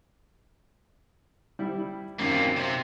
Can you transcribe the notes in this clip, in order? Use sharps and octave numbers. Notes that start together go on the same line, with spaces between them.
G3 E4 G4
F#2 C3 D#3 A#3
C3